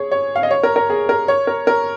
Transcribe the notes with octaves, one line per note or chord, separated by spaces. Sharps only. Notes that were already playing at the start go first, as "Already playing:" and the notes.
Already playing: G#4 C#5
C#5
F5
D#5
C#5
A#4
A#4
G#4
A#4
C#5
A#4
A#4